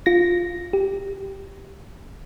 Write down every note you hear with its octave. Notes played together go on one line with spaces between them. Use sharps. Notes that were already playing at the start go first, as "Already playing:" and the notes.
F4 A#6
G4